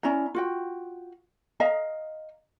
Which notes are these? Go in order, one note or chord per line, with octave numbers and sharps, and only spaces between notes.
C#4 E4 D5 A#5
F4 F#4 G5
D#5 F5 A#5